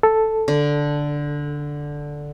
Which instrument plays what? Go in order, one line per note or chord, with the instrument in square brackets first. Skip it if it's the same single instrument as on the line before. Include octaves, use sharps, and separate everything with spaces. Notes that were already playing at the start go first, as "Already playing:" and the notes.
[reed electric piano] A4
[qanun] D3